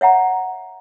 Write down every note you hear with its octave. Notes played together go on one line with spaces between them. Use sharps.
C#5 E5 F#5 A#5